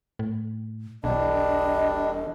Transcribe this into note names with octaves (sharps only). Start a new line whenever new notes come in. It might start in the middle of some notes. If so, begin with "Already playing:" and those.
A2
E1 B1 G3 D4 D#5